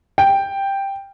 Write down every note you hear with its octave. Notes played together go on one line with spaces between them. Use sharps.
G5